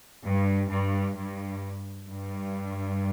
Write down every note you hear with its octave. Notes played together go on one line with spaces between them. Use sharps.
G2
G2
G2
G2